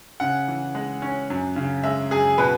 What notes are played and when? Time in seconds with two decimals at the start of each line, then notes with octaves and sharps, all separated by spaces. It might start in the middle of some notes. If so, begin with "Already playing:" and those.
0.20 C#3 F#5
0.48 E3
0.75 G#3
1.02 C#4
1.30 F#2
1.56 C#3
1.84 G#3 E5
2.11 F#2 G#4
2.38 B2 B4